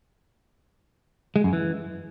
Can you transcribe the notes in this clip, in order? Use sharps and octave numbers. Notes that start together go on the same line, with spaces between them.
G#3
F#2
E3